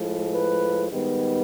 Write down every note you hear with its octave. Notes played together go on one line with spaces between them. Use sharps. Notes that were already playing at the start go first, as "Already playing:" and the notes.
Already playing: A2 F3 G#3
B4
G#2 D#3 G3 B3